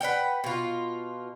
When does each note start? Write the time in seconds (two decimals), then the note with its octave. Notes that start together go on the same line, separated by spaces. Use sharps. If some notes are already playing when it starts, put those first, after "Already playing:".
0.01 B4 C#5 F#5 G5
0.44 B2 F4